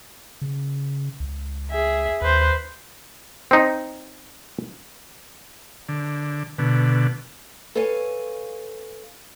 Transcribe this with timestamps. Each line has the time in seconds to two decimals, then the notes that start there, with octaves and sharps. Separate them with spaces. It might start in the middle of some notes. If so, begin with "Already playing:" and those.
0.42 C#3
1.20 C#2
1.71 G#4 E5
2.22 D#2 B4 C5
3.51 C4 D#4
5.89 D3
6.58 B2 D3
7.75 A4 B4 C#5 F5 G#5